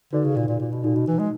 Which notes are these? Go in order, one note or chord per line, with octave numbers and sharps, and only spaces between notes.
D3 D#4 F#4 B4 D5
C#3
A#2
A#2
A#2
B2
A#2 D#4 F#4 A4
B2
E3
G#3